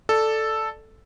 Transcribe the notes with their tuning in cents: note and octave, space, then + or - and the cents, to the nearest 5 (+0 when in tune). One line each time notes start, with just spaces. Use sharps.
A4 +0 D5 +15